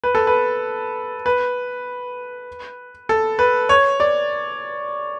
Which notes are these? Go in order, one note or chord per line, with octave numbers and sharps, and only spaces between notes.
B4
A4
B4
B4
A4
B4
C#5
D5